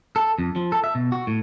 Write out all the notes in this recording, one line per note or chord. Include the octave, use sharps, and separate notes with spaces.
A4
F2
F3
A4
E5
B2
F#4
A2